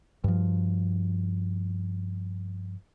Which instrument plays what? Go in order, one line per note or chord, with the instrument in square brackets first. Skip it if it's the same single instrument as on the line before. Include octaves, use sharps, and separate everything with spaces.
[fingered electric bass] G2 F3